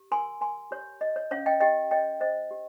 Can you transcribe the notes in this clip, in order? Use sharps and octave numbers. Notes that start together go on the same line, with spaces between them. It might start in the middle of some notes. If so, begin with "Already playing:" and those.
Already playing: G4
A#4 G#5 C6
A#4 G#5 C6
G4 C#5
C#5 D#5
C#5
C#4 C#5 F5
D#5 G5
G4 D#5 G5
C#5 D#5 G5
C5 D#5
G4